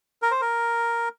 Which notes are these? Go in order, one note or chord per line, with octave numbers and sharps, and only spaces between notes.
A#4
C5
A#4